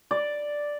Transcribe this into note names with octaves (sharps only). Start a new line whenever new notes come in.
D5